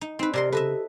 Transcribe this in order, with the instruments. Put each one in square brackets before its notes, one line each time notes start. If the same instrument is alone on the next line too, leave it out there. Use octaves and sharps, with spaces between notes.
[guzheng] D#4
[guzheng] C4 B4 [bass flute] D#4
[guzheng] C3 A#4 C6 [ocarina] G4 [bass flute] D5
[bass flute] C#3 [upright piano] A4 [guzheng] B4 D#5 E5